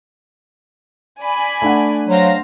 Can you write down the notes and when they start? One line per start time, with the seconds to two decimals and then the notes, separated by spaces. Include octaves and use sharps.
1.21 D5 G#5 B5
1.62 A3 D4 F#5
2.08 F#3 C5 F5 A#6